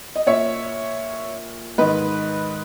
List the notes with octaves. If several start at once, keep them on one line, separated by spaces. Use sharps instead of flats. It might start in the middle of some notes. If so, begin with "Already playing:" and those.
D#5
A#2 C#5 E5
G#2 D#3 B4 D#5